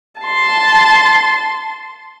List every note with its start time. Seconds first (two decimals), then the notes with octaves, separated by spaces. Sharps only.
0.22 A5 C6